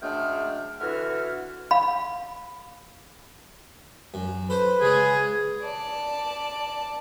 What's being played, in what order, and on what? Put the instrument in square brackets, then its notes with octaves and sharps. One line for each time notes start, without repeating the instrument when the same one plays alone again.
[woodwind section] F#2 G#3 A3 D4 G5 F6
D3 E3 F#4 E5 F#5 F6
[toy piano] F5 B5
[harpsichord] F#2
[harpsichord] A4 C5 [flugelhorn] B4
[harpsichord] C#3 G#3 [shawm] G#4
[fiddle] D5 A5